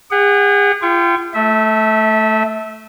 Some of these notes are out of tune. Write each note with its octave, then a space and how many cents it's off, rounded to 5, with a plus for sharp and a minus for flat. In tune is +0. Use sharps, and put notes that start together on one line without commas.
G#4 -40 F#5 +15
F4 -35 G5 +0 C#6 +0
A3 +0 E5 -25